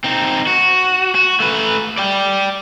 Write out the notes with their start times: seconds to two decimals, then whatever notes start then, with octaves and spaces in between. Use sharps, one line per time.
0.04 C4 D#4
0.47 F#4
1.15 F#4
1.40 A3 B4
1.98 D5 G5